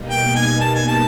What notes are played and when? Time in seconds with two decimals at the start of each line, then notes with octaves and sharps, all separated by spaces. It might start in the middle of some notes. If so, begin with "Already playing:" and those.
Already playing: B2 G3 A#3 D#4
0.10 G5
0.36 G#5
0.61 A5
0.74 G#5
0.88 A5